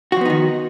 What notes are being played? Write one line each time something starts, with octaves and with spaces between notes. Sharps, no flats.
D#3 F3 B3 D#4 F#4